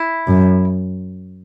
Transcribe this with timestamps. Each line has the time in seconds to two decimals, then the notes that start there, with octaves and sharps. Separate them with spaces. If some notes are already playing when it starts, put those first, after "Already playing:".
Already playing: E4
0.27 F#2